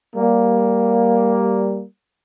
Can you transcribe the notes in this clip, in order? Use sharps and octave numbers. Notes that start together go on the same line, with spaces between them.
G3 A#3